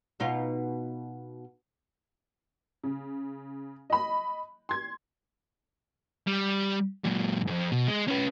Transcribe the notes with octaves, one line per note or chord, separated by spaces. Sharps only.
B2 D#4 F4
C#3
D#5 B5
C6 G#6
G3
F#2 A#2
F2 G#2
B2
G#3
C#4 B4